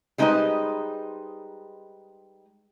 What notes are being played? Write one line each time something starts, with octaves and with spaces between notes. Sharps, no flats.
G3 G#3 D#4 B4 C5 D#5